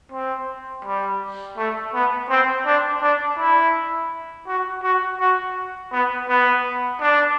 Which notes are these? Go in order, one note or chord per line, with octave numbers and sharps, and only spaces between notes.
C4
G3
A3
B3
C4
D4
D4
E4
F#4
F#4
F#4
B3
B3
D4